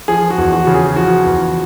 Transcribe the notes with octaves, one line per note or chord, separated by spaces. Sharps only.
F3 G#4
F#4
E2
F#4
C#3
G#4
F3 F#4
E2